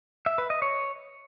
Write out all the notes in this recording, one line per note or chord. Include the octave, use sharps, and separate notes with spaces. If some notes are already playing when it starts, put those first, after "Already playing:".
E5
B4
D#5
C#5